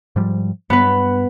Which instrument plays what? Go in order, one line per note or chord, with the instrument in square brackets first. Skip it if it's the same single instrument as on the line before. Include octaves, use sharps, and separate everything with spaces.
[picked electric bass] G#2 F3 G3
[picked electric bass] G2 [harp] B3 B4